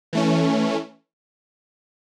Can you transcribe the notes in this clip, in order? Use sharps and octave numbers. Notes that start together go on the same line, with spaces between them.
E3 A3 C#4